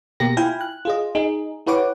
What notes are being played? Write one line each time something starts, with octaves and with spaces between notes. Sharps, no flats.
B2 A#3 G4 A#4 A#6
E4 F4 F5 G5 G#5 B5
F#6
F4 G#4 D#5
D#4 G#4
E4 G4 B4 C#5 F#5 D6